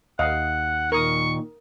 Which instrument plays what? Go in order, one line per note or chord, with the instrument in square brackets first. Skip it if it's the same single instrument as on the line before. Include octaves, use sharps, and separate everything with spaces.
[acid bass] D#2 [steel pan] D#5 F5 [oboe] F#5
[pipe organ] A#2 D#3 [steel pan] A#4 D#6 [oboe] C#6